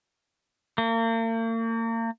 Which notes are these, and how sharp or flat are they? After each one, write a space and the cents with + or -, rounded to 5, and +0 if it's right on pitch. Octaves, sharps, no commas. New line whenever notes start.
A#3 -40